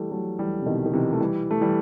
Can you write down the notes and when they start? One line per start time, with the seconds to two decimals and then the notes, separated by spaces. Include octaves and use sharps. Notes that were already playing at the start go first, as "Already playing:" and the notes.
Already playing: E3 G3 A3
0.11 F#3 A3
0.39 E3 G3
0.62 C3
0.66 B2 D#3
0.86 D#3
0.93 C3 E3
1.13 A3
1.20 E3 G3
1.51 A3
1.61 E3 G3